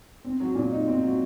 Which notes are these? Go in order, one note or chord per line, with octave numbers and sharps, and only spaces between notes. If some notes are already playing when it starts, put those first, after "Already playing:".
C4
F#3
A#2
D#4
C4
F#3